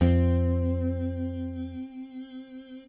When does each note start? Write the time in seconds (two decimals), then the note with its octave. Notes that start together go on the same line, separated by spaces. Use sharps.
0.01 F2 C4